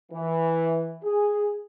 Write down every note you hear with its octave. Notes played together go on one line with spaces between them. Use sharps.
E3
G#4